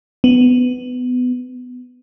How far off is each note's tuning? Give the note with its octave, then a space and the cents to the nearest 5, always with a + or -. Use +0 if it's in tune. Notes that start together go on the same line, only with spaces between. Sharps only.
B3 +15